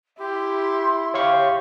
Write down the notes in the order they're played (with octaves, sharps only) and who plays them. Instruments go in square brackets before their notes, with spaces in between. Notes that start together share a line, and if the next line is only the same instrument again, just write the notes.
[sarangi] E4 [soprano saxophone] G4 [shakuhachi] C6
[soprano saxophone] G4 [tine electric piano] C#5 F5 C#6